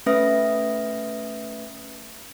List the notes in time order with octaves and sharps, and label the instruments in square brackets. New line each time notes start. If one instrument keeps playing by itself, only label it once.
[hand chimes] A3 C#4 B4 E5 D#6 A#6